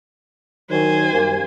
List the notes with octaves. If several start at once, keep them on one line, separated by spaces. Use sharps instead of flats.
D#3 F#3 C5 G#5
F#2 G3 A#3